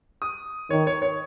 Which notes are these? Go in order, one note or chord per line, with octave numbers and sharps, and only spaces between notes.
D#6
D#3 C#5
C#5
C#5